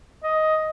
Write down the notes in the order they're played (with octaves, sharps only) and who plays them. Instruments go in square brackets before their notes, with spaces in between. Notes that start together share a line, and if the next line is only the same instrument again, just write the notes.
[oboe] D#5